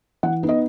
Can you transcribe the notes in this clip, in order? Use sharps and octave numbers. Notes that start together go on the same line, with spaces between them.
E3 F#5
B3 D#4
D#5